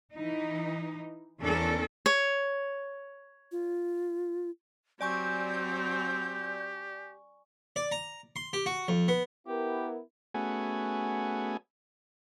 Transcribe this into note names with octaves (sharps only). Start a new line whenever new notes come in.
E3 D#4
E2 C#4 D4 A4 A#4 D5
C#5
F4
F#3 C4 G4 D5 G#5 C#6 G6
D5
A#5
C6
G4
F#4
F2
B3
B3 E4 G4 A#4
A3 B3 C#4 F#4 G#4 G#5